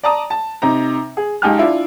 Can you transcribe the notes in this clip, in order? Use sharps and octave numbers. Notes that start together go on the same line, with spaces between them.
D5 A5 A#5 D#6
A5
C3 D#4 A#5
G#4
C#2 D#4 G4 G#5 A5 F6
D4 E4 F4